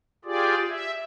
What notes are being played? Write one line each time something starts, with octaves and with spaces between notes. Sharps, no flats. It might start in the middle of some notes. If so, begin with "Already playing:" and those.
F4 G4 G#4 D5
E5